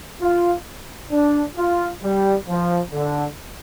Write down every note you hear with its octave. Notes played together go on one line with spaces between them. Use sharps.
F4
D4
F4
G3
F3
D3